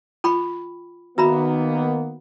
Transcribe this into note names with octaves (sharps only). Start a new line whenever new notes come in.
F4 G5 B5 C#6
D#3 A#3 B3 F#4 E5 A#5 B5